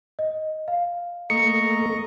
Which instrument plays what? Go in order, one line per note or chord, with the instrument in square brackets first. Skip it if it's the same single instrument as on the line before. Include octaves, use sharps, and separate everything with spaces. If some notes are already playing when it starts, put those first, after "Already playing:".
[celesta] D#5
F5
[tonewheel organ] A3 A#3 A4 [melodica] D#5 A#5 C#6 [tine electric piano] C#7